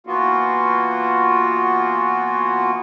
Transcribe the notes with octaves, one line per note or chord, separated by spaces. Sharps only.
E3 A#3 B3 F4 F#4